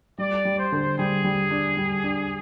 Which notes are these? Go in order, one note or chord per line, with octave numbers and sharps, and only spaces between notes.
G3 D5
G3
C5
D3
G3 G#4
G3
D4
G3
D4